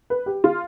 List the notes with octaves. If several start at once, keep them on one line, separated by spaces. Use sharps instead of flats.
B4
G4
F4